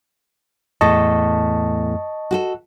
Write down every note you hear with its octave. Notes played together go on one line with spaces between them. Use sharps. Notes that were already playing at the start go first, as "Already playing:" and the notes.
E2 A2 A4 D#5 A5 C#6
F#4 G4 A4